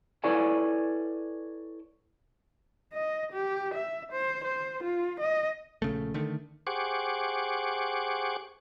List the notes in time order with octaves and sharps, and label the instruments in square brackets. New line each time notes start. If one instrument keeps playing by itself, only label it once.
[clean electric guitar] E4 A4 B4 C#5 D5 G#5
[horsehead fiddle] D#5
G4
E5
C5
C5
F4
D#5
[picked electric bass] A#1 C#3 A3
D3 D#3 A3
[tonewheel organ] G4 G#4 C5 F#5 C#6 D6